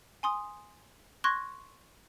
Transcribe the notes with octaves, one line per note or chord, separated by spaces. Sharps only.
G#5 C6 D#6
C6 C#6 F#6 G#6 A#6